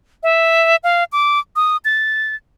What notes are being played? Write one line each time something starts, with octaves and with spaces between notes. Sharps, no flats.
E5
F5
D6
D#6
A6